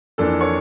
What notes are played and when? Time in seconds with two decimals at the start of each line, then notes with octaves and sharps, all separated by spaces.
0.18 F2 E3 A#3 D4 A4
0.41 C#5